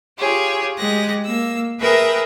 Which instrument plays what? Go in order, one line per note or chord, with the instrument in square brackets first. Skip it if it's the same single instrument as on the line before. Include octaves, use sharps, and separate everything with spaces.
[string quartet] F4 G4 G#4 C#5
G#3 G4 G#4 F#6 A#6
A#3 E6
G#4 A#4 B4 E5 G5